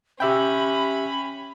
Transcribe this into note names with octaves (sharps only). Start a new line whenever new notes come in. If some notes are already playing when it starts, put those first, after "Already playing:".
C#4 G4 E5 G5 B5